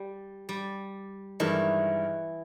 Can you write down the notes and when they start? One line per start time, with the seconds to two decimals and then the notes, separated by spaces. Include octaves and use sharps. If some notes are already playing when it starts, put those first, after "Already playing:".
Already playing: G3
0.49 G3
1.40 G2 D#3 E3 G#3 D#4 A#4